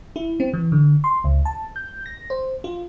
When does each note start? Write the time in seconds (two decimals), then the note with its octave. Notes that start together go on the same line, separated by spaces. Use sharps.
0.16 E4
0.40 C4
0.53 E3
0.72 D3
1.04 C6
1.24 C#2
1.45 A5
1.76 G6
2.06 A#6
2.30 C5
2.64 F4